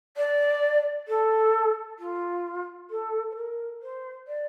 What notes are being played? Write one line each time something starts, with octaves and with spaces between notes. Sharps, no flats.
D5
A4
F4
A4
C5
A#4
C5
D5